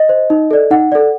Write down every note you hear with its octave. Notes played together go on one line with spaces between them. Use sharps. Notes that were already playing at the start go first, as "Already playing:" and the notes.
Already playing: D#5
C5
D#4
A4 D5
D#4 F#5
A4 D5